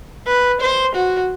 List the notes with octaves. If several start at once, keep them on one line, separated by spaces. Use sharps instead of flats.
B4
C5
F#4